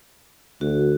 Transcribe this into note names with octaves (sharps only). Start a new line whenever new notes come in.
D2 F#4